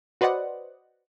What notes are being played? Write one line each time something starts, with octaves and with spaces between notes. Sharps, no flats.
F#4 B4 C5 D5 D#5 F#5